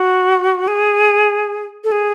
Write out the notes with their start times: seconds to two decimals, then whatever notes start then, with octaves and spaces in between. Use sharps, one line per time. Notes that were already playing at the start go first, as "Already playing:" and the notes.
Already playing: F#4
0.68 G#4
1.84 A4
1.92 G#4